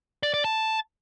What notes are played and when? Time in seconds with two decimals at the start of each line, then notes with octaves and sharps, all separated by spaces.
0.23 D5
0.34 D5
0.45 A5